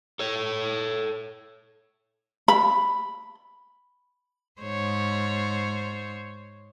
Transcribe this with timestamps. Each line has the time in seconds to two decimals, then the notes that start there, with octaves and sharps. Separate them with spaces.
0.19 A4 C#5
2.48 B5
4.62 G#2 C5 C#5